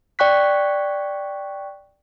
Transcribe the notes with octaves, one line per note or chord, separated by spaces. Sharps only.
D5 G5 C#6 F#6 B6